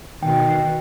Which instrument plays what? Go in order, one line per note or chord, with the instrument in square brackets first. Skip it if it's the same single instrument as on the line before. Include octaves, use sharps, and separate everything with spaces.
[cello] B2 [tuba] D#3 [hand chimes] G5